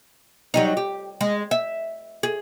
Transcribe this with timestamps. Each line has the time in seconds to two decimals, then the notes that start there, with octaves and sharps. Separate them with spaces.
0.54 F#3 G3 D#4
0.77 G4
1.21 G#3
1.51 E5
2.23 G#4